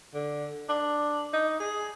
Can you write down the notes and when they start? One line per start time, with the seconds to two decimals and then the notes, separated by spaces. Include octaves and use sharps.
0.14 D3
0.69 D4
1.33 D#4
1.60 G#4